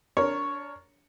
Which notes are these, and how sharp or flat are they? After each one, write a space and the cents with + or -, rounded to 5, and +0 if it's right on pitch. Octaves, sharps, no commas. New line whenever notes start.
D4 -25 A#4 +0 C#5 +0